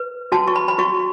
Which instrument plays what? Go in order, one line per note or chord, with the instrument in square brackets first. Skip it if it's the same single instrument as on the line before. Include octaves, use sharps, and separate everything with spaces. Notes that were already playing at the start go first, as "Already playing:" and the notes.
Already playing: [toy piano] B4
F#4 A5
C#6
B5
B5
F#4 C#6